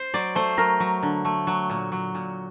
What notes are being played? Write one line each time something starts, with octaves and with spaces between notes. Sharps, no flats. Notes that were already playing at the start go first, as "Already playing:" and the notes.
Already playing: C5
F#3 D5
A3 C5
F#3 A#4
F#3
D3
A3
F#3
A#2
F#3
A#2